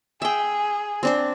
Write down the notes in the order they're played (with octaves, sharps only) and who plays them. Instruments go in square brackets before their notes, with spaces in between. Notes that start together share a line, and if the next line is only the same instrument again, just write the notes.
[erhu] G#4 [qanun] E5 G5
[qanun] C4 D4 C5